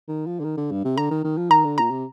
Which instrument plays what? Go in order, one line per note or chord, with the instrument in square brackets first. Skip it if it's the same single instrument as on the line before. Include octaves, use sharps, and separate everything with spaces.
[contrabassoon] D#3
F3
D3
D#3
D3
G2
C3
[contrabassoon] D3 [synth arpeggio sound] A#5
[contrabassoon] D#3
D#3
F3
[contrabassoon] D#3 [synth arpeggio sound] A#5
[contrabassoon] D3
[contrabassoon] A#2 [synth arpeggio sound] A#5
[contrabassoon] C3